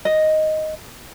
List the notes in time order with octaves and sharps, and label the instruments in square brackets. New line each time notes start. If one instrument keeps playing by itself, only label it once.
[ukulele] D#5